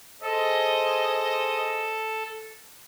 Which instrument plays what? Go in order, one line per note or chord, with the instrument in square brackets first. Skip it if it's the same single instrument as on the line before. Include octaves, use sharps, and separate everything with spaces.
[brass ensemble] G#4 C5 D#5 [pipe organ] A4